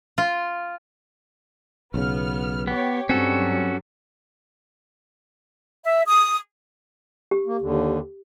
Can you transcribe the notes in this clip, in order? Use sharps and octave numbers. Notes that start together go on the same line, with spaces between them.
F4
B1 C#3 B3 F6
B3 G4 C#5
G2 F#3 G3 C4 C#4 F#4 A4
E5
D#6
G4
A#3
D#2 D3